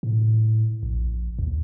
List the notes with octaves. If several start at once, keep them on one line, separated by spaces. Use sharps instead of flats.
A2
A#1
D#2